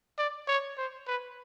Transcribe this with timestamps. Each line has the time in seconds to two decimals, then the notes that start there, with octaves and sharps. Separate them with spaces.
0.18 D5
0.48 C#5
0.78 C5
1.07 B4